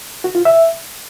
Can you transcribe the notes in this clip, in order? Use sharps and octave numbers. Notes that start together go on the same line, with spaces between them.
F#4
F4
E5